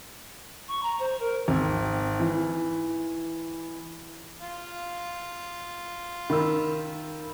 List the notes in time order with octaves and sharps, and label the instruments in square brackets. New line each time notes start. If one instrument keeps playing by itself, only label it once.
[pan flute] C#6
A#5
C5
A#4
[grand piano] G#1
E3
[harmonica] F4
[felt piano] D#3 [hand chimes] B5 E6